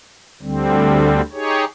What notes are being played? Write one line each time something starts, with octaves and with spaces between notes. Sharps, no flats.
D2 D3 G3 C4
D#4 G4 G#4 C#5